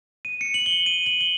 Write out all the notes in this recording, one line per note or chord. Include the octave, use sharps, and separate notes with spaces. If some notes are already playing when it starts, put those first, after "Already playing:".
D#7
C#7
F#7
G7
D#7
F#7
G7